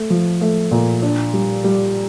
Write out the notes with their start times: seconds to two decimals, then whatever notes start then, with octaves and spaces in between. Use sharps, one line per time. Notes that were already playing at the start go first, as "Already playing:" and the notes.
Already playing: A3
0.10 F3
0.41 A3
0.71 A#2
1.02 D4
1.33 G3
1.64 G3